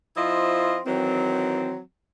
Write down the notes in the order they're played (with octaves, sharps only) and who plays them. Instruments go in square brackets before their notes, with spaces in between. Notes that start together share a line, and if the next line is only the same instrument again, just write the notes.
[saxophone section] F3 C4 E4 F4 D#5
D#3 E3 F#3 C4